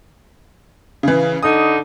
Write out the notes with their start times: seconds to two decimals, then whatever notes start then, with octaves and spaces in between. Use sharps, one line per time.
1.03 C#3 E3
1.43 D3 D#4 D#6